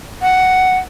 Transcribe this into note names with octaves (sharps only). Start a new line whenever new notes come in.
F#5